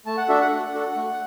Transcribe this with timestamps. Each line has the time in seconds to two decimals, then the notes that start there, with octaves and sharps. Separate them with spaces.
0.06 A3 A5
0.17 F#5
0.29 D4 F#4 A4 E5
0.40 F#5
0.52 A3
0.73 D4 F#4 A4
0.96 A3